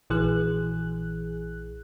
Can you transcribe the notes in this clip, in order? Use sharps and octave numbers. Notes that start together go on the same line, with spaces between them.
A#1 E3 G#4 F#6